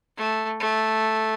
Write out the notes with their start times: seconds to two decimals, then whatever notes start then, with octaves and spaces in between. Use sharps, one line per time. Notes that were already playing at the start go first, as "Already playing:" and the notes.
0.17 A3
0.61 A3